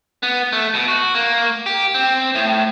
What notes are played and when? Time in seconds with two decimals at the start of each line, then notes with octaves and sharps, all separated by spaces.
0.23 B3
0.53 A3
0.74 B2
0.88 F#4
1.15 A#3
1.66 G4
1.94 C4
2.35 A2